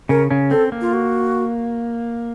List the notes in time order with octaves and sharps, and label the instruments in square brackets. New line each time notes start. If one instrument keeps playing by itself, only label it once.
[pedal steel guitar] C#3 C#4 [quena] A#4
[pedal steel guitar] C#3 C#4
[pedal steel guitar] C4 [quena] A4
[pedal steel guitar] A#3
[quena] F4
F#4